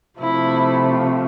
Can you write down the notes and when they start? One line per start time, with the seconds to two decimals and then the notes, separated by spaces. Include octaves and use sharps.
0.19 C3 F3 A3 E4